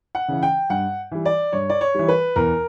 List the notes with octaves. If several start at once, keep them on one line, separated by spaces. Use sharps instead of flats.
F#5
C#3 E3
G5
G2 F#5
E3 G3
D5
G2 C#5
D5
C#5
E3 G3
B4
E2 A#4